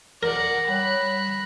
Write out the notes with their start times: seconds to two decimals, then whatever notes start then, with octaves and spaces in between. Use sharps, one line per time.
0.23 A#4 D5 F#5 A#6
0.68 G3 C#5 B5 F#6